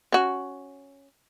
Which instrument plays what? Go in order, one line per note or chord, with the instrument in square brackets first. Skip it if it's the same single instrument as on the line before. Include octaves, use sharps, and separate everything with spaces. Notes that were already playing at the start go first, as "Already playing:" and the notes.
[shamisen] C#4 F#4